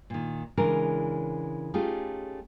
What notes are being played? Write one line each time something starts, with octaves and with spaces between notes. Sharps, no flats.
A#2 D#3
C#3 E3 G#3 D4 A#4
A3 C#4 D#4 F4 G4 G#4